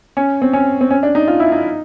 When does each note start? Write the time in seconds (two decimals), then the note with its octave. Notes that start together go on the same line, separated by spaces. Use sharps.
0.17 C#4
0.42 C4
0.53 C#4
0.81 C4
0.91 C#4
1.03 D4
1.15 D#4
1.28 F4
1.40 E4
1.52 D#4